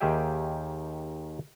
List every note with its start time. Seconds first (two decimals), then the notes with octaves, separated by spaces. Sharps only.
0.01 D#2 D#3 G4 G#4 E5 G5